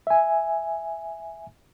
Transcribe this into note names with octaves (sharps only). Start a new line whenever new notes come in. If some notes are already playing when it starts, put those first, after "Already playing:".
E5 G#5